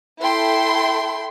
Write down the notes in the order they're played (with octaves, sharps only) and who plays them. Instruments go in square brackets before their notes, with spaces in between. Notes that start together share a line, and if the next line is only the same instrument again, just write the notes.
[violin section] E4 A4 G5 C6